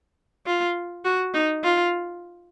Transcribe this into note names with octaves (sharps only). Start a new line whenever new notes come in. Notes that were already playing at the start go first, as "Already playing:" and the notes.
F4
F#4
D#4
F4